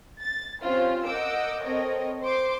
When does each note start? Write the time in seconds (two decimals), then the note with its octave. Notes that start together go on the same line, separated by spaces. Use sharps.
0.21 A6
0.63 C4 C#4 F4 G4 C5
1.06 A#4 D#5 F#5 D6 E6 G6
1.63 C4 A4 A#4 C#5 D#5
2.22 C5 C6 D6